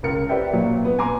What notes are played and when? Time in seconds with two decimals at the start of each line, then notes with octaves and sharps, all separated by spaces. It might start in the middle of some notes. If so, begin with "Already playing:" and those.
0.03 C#2 A#4 C#7
0.29 G4 B4 C5 D5 E5 G5
0.52 A#2 F#3
0.66 A#2
0.85 B3
0.99 G#5 A#5 C6 D6